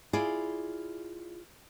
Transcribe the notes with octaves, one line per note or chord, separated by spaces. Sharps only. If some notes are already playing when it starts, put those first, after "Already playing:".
E4 F4 G#4 D5